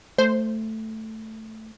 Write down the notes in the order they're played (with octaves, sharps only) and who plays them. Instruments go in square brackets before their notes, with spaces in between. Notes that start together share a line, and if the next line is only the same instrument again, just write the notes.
[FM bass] A3 [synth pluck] C5